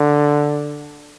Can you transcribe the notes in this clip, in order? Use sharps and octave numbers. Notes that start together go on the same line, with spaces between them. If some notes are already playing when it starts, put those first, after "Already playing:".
Already playing: D3